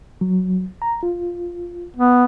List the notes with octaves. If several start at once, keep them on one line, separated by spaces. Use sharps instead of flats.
F#3
A#5
F4
B3